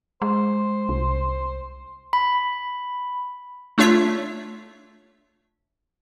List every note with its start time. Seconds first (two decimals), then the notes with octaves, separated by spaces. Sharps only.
0.22 G#3 C5
0.89 C2
2.13 B5
3.78 A3 D4 F4 C#5 E5 B6